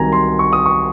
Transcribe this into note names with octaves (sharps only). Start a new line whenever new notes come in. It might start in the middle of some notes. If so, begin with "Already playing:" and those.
Already playing: C2 C3 D#3 F#3 G#5 A#5
C6
C#6
D#6
C#6